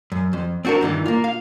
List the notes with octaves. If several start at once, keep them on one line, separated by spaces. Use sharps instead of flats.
F#2
F2
C4 D4 F#4 G4 A#4
E2 G2 D#3 E3
A#3 F4
F5